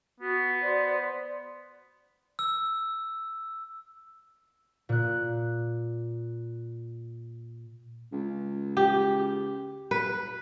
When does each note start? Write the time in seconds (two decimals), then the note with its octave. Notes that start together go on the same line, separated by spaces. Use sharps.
0.20 B3 F#4
0.61 C5 D5
2.39 E6
4.89 A#2 F#6
8.12 C#2
8.77 G4
9.91 B4